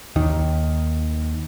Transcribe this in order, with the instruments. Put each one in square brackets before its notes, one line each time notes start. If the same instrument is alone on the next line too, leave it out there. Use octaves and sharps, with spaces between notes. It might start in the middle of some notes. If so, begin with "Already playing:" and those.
[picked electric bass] D#2 D#3